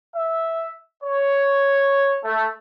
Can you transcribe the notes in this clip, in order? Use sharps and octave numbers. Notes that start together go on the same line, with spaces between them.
E5
C#5
A3